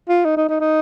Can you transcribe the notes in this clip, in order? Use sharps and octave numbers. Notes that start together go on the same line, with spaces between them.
F4
D#4
D#4
D#4
D#4